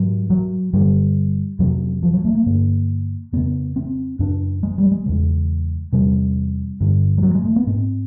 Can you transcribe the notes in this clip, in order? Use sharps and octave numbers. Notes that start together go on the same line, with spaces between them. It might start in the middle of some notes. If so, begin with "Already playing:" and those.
Already playing: G#2 F#3
F#3
G2 D3 G3
F2 C3 F#3
F3
F#3
A3
A#3
G2 D3
F2 C#3 B3
C4
F#2 C#3 D4
G#3
G3
G#3
E2 C#3
E2 C3 G3
G2 D3
G3
F#3
G#3
A3
B3
G#2 C4